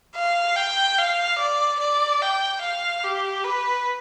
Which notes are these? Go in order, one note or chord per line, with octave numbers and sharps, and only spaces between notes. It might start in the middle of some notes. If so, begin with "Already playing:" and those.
F5
G5
F5
D5
D5
G5
F5
G4
B4